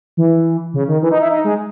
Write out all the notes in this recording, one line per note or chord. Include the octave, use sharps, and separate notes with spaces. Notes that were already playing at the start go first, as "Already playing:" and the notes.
E3
C#3
D#3
E3
D#4
E4
D#4
G#3